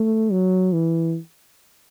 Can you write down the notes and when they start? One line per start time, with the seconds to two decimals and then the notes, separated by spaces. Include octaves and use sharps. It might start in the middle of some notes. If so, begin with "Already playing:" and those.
Already playing: A3
0.32 F#3
0.73 E3